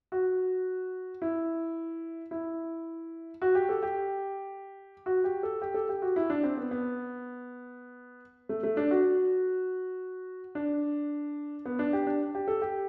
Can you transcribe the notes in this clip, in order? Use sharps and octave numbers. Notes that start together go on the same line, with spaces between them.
F#4
E4
E4
F#4
G4
A4
G4
F#4
G4
A4
G4
A4
G4
F#4
E4
D4
C4
B3
B3
A3
A3
D4
F#4
D4
B3
D4
G4
D4
G4
A4
G4